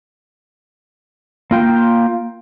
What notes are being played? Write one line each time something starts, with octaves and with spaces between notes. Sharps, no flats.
A#3 F4 G5